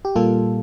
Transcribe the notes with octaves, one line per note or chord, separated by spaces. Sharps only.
G4
A#2 G3 A#3 F4 A4